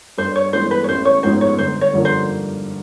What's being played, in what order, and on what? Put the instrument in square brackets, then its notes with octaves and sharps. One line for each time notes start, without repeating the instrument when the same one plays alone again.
[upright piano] G2 [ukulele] C5
[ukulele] C#5
[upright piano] E3 G#3 B3 [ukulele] C5
[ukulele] B4
C#5
[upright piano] A1 [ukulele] C5
[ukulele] C#5
[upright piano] G#2 F3 G#3 B3 [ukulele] C5
[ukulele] C#5
[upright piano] G1 [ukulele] C5
[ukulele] C#5
[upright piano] G2 D3 F3 A#3
[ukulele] C5